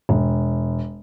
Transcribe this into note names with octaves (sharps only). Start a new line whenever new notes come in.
E1